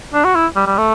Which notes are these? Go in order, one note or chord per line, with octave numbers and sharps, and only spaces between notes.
D4
F#4
E4
G3
G3
A3